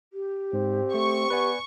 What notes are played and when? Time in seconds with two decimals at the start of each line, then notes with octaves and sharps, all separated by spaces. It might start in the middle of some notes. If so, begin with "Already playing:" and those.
0.13 G4
0.53 G#2 C4
0.94 A3 C#6
1.30 B3 B4 D5 G#5